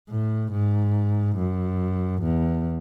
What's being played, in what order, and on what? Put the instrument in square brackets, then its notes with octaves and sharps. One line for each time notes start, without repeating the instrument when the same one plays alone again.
[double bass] A2
G#2
F#2
E2